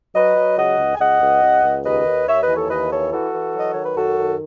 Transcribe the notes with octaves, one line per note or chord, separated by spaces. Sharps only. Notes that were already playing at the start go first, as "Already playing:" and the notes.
F#3 B4 D#5
F#3
C#2 D#5 F#5
C#2
G#5
C#2 D#5 F#5
C#2
C#2
C#2
D#2 B4 D#5
D#2
D#2 C#5 E5
B4 D#5
E3
A4 C#5
D#2 B4 D#5
E3 A4 C#5
E3 F#4 A4
E3
F#3
D#5
D#3 C#5
B4
F#2 F#4 A4
D#3